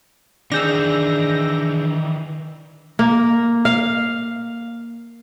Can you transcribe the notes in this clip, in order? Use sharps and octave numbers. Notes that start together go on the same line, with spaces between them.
D#3 E3 D4 G#4 E6 G6 A#6
A#3
F5